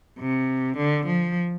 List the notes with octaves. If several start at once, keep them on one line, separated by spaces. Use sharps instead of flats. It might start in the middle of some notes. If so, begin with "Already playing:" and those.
C3
D3
F3